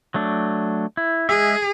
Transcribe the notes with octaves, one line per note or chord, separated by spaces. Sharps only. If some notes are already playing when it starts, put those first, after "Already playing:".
F#3 A3 D4
E4
G#3 G#4 E5